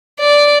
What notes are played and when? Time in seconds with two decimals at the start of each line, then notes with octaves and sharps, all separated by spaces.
0.20 D5